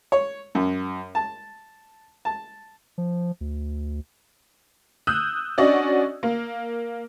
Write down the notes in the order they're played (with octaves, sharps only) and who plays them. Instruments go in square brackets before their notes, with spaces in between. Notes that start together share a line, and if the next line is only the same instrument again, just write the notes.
[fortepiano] C#5
F#2
A5
A5
[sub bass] F3
D2
[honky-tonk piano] D#6 E6 F#6 G6
C#4 D4 F#4 D5 D#5
A#3